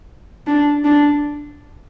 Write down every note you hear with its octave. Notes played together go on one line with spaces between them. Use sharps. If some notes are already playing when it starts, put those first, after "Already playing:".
D4
D4